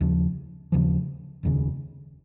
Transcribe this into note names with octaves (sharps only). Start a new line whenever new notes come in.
D#2 C#3 F3
D#2 C#3 F3
F1 D#2 C#3